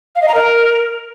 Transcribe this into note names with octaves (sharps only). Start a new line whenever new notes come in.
F5
D#5
A#5
A#4